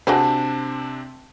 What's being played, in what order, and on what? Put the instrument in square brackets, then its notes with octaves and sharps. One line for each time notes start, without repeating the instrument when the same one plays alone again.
[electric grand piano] C3 C4 D4 [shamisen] F#4 G#4 C5 [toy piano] F#5 A5